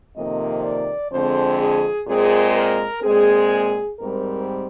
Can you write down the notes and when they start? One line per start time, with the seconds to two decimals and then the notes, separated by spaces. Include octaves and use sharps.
0.15 F2 C3 D#3 A#3 D#5
0.64 D5
1.12 F2 D3 G#3 C4 C5
1.60 G#4
2.07 A#2 G#3 C4 G#4
2.56 A#4
3.03 A#2 G#3 C4 G#4
4.00 G#2 G3 C4 A#4